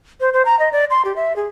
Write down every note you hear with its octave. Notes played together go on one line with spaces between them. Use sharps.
C5
C5
A#5
D#5
D5
C6
G4
E5
G#4